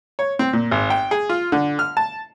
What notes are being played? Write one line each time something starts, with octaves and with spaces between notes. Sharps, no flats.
C#5
C4
A#2
G#1
G5
G#4
F4
D3
F6
A5